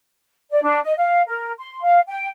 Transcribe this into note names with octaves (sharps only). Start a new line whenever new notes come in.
D5
D4
D#5
F5
A#4
C6
F5
G5